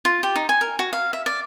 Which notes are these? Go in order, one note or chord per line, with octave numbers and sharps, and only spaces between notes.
F4
G4
D#4
G#5
A#4
F#4
F5
E5
D5